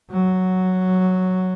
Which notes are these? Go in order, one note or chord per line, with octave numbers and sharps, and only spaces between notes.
F#3